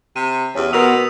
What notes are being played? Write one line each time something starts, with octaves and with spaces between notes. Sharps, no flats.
C3 D#7
E2 C#4 G4
B2 B3 F#4 A#4 C6 D#6 E6 F7